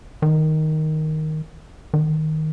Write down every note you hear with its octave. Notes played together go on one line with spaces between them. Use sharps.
D#3
D#3